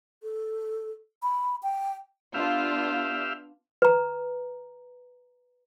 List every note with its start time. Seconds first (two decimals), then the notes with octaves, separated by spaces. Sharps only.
0.23 A4
1.23 B5
1.63 G5
2.34 B3 D4 F4 G4 E5 F5
3.82 B4 A#5